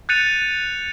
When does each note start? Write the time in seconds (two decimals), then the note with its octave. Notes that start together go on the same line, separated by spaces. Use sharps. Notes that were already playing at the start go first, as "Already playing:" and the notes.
0.09 F#6 G6 A6 C#7 D#7 F7